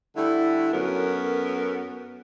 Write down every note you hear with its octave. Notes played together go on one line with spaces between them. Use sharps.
D3 G3 A3 E4
F#2 F#3 B3 F#4 A4 A#4